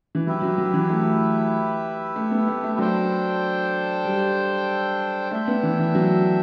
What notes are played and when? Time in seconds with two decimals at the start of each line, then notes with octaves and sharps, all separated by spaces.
0.15 E3
0.26 F#3 E4 G4 B4 E5
0.42 F#3
0.58 F#3
0.74 E3
0.89 A3
2.16 A3
2.31 B3
2.48 A3
2.64 A3
2.78 F#3 D4 A4 C5 G5
4.05 G3
5.31 A3 D4 A4 E5 G5
5.48 B3
5.63 E3
5.79 E3
5.95 F#3